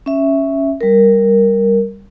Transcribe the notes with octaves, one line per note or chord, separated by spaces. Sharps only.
C#4 E5
G3 A#4